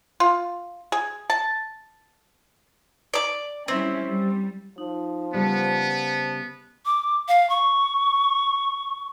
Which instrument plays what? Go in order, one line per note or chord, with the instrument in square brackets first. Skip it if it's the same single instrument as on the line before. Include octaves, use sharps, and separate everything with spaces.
[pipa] F4
G#4
A5
[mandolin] D5 D6
[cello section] G3 C#4 E4 [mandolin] C4
[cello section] G3
[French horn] F3 [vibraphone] D#4
[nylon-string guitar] C#3 G3 [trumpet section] B3 [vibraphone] C5 A5
[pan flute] D6
F5
C#6